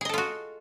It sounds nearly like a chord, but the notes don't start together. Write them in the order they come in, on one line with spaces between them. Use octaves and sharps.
G#4 D#5 A4 F4 F#4